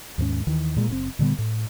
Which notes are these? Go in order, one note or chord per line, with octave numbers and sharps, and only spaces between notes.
D#2 G#2 A#3 C#4
D#2 D#3 E3
A#2 G#3
F#1 C#3 C4
A#2 D3 G3 B3
A2